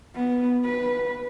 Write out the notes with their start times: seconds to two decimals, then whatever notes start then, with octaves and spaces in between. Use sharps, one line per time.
0.15 B3
0.65 B4